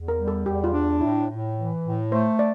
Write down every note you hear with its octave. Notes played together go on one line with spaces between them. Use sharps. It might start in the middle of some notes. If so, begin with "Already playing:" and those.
Already playing: E2
A#4
G3
A4
E2 G4
F4
D4
A2 E4
A2
E3
A2
A3 C5
D5